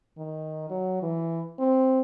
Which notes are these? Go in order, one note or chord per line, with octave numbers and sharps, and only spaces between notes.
D#3
F#3
E3
C4